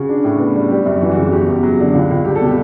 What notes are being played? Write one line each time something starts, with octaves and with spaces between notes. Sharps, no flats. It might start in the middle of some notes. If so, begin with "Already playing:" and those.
Already playing: C#3 F#4
D4
A2
B3
G3
G3 G4
F#2
E3 F#4
F#4
C#3
F#4
E2 G4
E2
F#3
D3
C#2
C#2
G3 G4
A4
B2
G4